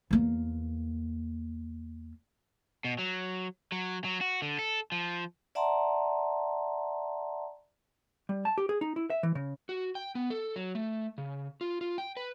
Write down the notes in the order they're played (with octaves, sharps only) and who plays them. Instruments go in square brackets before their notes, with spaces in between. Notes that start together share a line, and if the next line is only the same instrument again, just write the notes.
[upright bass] E2 A#3
[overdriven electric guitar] B2
F#3
F#3
F#3
F#4
D3
A4
F3
[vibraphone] D5 E5 F#5 A5 A#5 C6
[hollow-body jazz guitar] G3
A5
G4
G#4
D#4
E4
E5
E3
C#3
[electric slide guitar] F#4
G5
B3
A4
F#3
A3
C#3
F4
F4
G5
B4